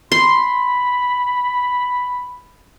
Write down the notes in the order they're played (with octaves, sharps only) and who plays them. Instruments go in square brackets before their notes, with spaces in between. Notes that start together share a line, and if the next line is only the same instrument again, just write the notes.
[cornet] B5 [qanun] C6